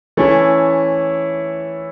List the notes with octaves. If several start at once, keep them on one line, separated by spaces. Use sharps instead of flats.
E3 A3 C#4 E4